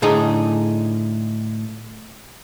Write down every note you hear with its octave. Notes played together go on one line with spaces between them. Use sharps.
A2 D3 D#4 G#4